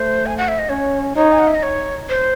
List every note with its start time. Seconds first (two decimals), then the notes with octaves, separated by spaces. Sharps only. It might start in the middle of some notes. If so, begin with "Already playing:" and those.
Already playing: A3 C5
0.26 G#5
0.38 F#5
0.48 E5
0.59 D#5
0.69 C#4 C#5
1.16 D#4 C#5
1.32 G#5
1.39 F#5
1.47 E5
1.55 D#5
1.63 C#5
2.09 C5